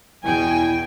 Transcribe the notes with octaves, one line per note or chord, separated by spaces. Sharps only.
E2 B2 E4 G5 G#5